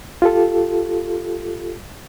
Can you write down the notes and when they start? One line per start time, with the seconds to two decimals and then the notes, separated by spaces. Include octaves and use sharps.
0.22 F4 G4 A4